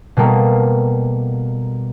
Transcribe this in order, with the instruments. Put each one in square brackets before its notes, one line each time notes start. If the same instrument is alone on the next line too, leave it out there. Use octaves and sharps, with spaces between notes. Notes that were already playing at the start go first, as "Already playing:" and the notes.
[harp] B2 G3 A#3 A4